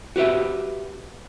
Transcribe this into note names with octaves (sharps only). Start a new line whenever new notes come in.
F#4 G4 B4 E5